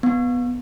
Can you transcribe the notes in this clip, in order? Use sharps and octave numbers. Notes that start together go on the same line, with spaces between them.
B3